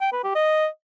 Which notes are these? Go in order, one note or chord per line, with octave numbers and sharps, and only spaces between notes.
G5
B4
G4
D#5